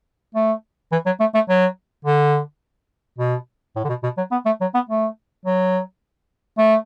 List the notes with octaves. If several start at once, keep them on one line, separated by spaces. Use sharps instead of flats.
A3
E3
F#3
A3
A3
F#3
D3
B2
A2
D3
B2
B2
F#3
B3
A3
F#3
B3
A3
F#3
A3